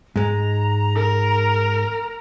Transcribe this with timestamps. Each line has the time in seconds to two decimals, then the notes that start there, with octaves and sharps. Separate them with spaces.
0.16 G#2 G#3 A#5
0.96 A#4